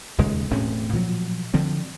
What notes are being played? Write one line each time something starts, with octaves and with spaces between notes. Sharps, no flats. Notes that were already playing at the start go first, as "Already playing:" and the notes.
D#1 D#2 C#3 G#3
E1 A2 C4 C#4
A#2 F3 F#3
D3 F3 C4